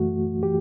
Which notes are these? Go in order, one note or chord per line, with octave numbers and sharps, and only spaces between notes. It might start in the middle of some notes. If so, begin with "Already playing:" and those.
Already playing: F#2 E3 A3 F#4
E3 G4